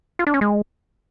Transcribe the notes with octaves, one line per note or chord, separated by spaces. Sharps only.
F4
D4
C#4
G#3